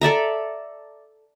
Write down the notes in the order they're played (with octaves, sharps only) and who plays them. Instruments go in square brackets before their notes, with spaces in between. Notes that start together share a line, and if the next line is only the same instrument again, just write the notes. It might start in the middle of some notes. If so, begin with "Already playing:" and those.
[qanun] A4 D5 E5 A#5